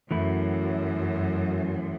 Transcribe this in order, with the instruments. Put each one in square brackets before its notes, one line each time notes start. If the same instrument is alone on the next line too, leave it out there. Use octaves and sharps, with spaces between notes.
[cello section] F#2 [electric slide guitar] E3 A3 E4